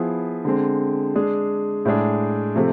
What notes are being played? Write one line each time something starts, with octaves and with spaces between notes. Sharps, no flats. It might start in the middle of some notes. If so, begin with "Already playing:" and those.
Already playing: F3 B3 E4 G#4
D3 G#3 C4
G#3 D4 G#4
A2 G#3 D4 G#4
C3 F3 A3 C4